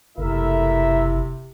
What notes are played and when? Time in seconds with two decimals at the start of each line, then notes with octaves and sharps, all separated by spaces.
0.18 F#1 C3 A3 E4 A#4 E5